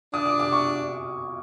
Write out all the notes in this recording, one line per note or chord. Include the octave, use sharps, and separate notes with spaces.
D4 D#6
D6
D6
C#6